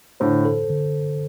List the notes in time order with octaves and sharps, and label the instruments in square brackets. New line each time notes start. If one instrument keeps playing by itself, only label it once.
[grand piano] A2 D3 [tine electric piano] C5
[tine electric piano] A4
D3